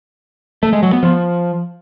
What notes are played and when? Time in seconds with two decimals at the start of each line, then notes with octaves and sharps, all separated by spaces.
0.63 A3
0.73 G#3
0.83 F#3
0.93 B3
1.03 F3